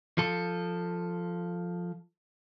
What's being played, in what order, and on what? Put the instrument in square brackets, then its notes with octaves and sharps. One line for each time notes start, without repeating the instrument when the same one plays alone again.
[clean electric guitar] F3 A4